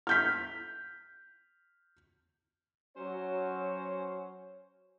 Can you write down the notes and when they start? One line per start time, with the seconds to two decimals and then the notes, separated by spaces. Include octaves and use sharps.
0.07 F6 G6 B6
2.96 F#3 C#4 C5 C#5